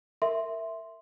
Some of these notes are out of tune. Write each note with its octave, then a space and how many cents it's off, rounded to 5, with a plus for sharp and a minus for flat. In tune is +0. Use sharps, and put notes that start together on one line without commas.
A#4 -15 E5 +0 C6 +0